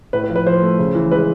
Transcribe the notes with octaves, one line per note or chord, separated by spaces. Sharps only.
A2 B4
B4
F3
B4
F3 C5
A3
C#3
E3
G#3 B4